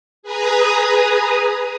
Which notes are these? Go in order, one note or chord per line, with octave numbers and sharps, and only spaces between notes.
G#4 B4 G#5 A#5 D#6